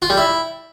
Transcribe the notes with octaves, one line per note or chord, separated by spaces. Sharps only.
F4
G3
E4